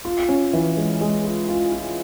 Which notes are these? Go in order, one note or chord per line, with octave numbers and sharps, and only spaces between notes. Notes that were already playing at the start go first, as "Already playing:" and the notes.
F4
C#4
E3
G#3
G#3
F4
F4
F4